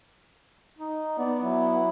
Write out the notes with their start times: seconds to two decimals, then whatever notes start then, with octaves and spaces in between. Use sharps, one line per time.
0.79 D#4
1.18 B3 D5
1.41 F#3 E4